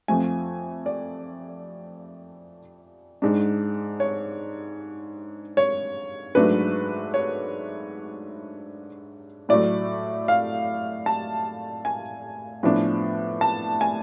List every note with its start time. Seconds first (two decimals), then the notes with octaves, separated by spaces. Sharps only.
0.08 F2 F3 A3 G#5
0.86 D5
3.22 G#2 G#3 D4
4.00 C#5
5.57 C#5
6.35 G#2 F#3 A3 D4 B4
7.14 C#5
9.49 A2 F#3 A3 D5
10.28 F5
11.06 A5
11.85 G#5
12.63 A2 F3 B3 D4
13.41 A5
13.81 G#5